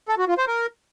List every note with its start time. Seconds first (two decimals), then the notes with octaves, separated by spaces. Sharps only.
0.09 A4
0.18 F#4
0.28 F4
0.38 C5
0.48 A#4